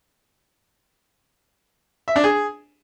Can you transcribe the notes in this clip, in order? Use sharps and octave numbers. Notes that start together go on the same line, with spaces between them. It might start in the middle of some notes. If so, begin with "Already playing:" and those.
E5
D4
G#4